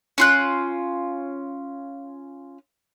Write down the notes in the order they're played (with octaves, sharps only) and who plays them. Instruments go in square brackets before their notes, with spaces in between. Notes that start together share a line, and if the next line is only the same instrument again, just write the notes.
[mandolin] C#4 F4 F#6